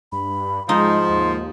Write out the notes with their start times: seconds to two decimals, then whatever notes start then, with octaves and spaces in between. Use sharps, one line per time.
0.12 G2 B5
0.69 G#2 F3 G#3 D#4 C6
1.09 D#2